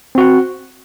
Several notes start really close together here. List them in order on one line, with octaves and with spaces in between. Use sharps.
C4 F#4 F#5